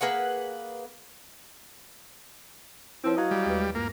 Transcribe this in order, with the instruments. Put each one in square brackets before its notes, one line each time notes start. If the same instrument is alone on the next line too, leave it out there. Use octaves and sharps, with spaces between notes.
[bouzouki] A#3 G#4 B4 F#5
[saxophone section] F3 C4 [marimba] E4 B4 C#5
[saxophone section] F#3 D#5 F5
[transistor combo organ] G3
[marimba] D#2 G#3 B4
[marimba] G2 [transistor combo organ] A#3